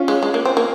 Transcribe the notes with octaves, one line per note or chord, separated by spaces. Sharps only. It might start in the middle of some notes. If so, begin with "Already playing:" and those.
Already playing: C#4 F4
G#3
G#3
A#3
C4
A#3